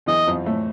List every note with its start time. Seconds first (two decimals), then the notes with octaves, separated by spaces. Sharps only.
0.06 E2 E3 D#5
0.27 F2 F3
0.46 A2 A3